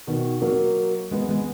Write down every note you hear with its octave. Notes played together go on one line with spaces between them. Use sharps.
B2 D#3
F#3 A#3
G#3 B3
G#3 B3